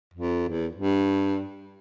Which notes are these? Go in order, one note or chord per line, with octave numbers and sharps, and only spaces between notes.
F2
E2
G2